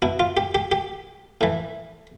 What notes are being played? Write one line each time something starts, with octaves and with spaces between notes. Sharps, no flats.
B2 E4
F4
G4
G4
G4
A2 E3